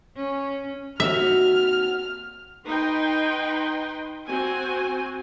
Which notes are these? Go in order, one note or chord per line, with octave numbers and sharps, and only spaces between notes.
C#4
D#2 C4 F#4 E5 F6
D#4 B4 G5 C6
C4 F#4 G#5